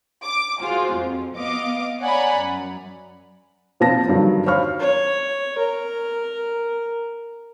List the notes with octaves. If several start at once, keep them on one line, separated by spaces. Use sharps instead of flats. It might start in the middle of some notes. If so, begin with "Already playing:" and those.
D6
F4 F#4 G#4 C5
F2
B3 D#5 F5 D6
C#5 D5 F#5 G#5 A#5 B5
F#2
A#2 F3 C4 B4 A5 A#6
G2 D3 D#3 F#3
C5 C#5 F5 B5 C#6 F6
C#5
A#4